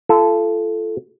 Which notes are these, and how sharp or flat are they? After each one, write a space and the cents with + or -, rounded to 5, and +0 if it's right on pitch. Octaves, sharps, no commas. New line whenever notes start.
F4 -35 A4 -10